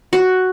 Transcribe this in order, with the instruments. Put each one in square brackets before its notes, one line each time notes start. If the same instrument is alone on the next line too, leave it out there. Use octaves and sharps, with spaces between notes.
[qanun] F#4